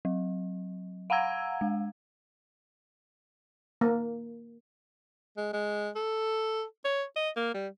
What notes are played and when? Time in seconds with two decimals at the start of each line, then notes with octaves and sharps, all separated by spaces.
0.05 F#3
1.10 F5 F#5 G#5 A#5 E6 G#6
1.61 G#3
3.81 A#3
5.37 G#3
5.53 G#3
5.96 A4
6.85 C#5
7.16 D#5
7.36 A#3
7.54 G3